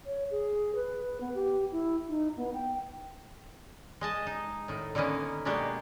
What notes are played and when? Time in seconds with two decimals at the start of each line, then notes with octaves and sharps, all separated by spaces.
0.06 C#5
0.31 G#4
0.75 B4
1.21 B3
1.34 G4
1.72 E4
2.09 D#4
2.37 B3
2.54 G5
4.01 G#3 D#5 A5
4.27 D#4
4.68 A2 D#3
4.95 D3 D#3 A#3 B3 C#4
5.45 B2 G#3 A#3 D4 F#4 G4